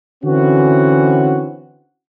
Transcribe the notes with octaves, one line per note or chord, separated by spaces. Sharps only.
D3 E3 C4 C#4 F#4